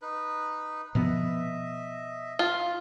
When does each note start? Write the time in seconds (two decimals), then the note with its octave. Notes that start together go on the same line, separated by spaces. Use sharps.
0.02 D#4 B4
0.95 B2 F3 B3 D#5 E5
2.39 F4